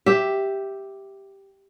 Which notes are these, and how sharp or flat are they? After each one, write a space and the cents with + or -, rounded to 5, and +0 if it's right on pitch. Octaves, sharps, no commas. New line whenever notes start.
G4 +0 E5 +0